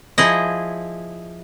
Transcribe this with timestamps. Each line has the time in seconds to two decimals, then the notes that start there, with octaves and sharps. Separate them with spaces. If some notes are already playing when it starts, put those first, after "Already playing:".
0.18 F3 E4 G#4 D#5